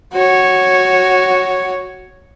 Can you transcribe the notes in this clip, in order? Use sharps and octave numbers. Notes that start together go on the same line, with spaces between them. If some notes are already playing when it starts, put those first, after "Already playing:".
F#4 C#5